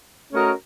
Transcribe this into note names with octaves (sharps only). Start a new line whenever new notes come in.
A3 C#4 F#4 A#4 D#5